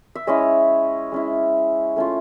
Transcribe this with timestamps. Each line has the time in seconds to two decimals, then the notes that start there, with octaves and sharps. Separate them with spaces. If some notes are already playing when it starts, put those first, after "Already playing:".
0.15 E5
0.27 G#3 C#4 E4 C#5 D#5
1.12 G#3 C#4 E4
1.96 A3 C#4 F4